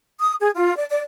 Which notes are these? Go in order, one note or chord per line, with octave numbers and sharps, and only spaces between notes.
D#6
G#4
F4
D5
D5